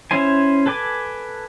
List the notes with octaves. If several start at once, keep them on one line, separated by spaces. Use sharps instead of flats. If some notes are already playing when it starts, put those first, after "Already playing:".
C#4 E4 C5 G#5
A4 B4 G#5 D6